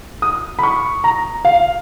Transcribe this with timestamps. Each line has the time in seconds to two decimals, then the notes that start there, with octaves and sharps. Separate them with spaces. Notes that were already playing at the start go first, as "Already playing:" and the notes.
0.22 D#6
0.59 B5
0.63 C#6
1.04 A#5
1.45 F5